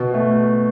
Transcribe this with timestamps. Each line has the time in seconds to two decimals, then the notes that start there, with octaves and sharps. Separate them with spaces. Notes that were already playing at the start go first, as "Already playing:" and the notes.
Already playing: B2
0.14 A3